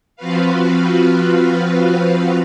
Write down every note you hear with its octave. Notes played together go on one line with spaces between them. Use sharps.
F3 C4 F4 F#4 B4 F5